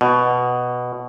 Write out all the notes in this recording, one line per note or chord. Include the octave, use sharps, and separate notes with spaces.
B2